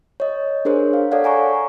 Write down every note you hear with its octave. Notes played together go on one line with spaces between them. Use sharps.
C#5 D#5
D4 G#4 A#4 C5 C#5
F5
A4 C#5 D5 F5 F#5
F#5 G#5 A#5 C#6